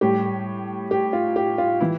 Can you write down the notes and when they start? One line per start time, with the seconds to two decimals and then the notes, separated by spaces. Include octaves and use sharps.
0.01 A2 G3 G4
0.91 G4
1.13 F4
1.36 G4
1.58 F4
1.80 E3 E4